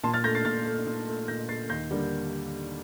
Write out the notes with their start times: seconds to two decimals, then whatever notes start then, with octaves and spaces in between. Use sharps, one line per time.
0.03 A#2 A5 C6
0.14 F6 A6
0.24 A3 G6 A#6
0.35 A6 C7
0.45 A#2 F6 A6
0.66 A3
0.87 A#2
1.07 A3
1.28 A#2 G6 A#6
1.49 A3 A6 C7
1.69 D#2 G6 A#6
1.91 D3 G3 A#3